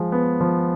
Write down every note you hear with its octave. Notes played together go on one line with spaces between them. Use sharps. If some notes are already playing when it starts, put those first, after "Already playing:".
Already playing: F3 G#3
B3
F3